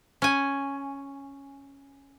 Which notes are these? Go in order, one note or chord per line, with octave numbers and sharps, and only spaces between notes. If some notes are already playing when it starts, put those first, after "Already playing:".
C#4 G#5